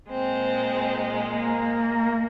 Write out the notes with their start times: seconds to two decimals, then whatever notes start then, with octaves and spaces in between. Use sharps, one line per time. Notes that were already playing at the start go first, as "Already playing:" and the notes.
0.11 A#2 G#3 C4
1.34 A#3